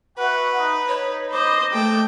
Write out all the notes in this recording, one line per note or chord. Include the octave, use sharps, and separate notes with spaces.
F#4 B4 E5 F#5 F#6
D#4
D#4 C#5 B5
C5 D#5 D6
A3 G5